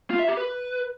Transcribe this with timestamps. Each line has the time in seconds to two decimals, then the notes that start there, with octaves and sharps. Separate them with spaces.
0.10 F4
0.19 E5
0.28 G4
0.37 B4